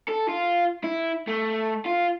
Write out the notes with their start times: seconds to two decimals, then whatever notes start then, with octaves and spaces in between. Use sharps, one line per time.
0.09 A4
0.29 F4
0.84 E4
1.28 A3
1.86 F4